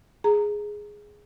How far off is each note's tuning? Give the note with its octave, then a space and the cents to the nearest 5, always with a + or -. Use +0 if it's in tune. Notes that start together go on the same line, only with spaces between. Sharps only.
G#4 +0 A#5 -15